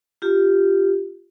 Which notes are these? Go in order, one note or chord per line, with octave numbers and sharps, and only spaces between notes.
F4 G4